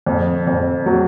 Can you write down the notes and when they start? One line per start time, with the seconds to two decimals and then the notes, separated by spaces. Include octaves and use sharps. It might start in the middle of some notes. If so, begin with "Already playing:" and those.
0.06 F2
0.47 F2
0.86 F#3